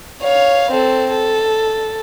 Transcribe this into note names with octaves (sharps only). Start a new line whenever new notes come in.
C#5 F5
C4 A4
A4